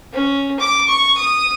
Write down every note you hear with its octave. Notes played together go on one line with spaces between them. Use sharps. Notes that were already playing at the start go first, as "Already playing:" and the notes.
C#4
D6
C#6
D#6